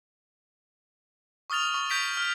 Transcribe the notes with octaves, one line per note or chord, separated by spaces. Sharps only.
C#6 D#6 F6 A6 F7
C#6
G6 A#6 B6 D7 F7
F6